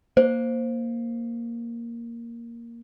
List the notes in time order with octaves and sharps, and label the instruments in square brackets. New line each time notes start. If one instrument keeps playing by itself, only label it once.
[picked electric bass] A#3 [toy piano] C5